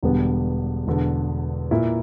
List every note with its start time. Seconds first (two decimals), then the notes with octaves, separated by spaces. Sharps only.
0.03 E1 E2 D3 G3 B3
0.87 E1 E2 D3
1.71 A#2 A#3 E4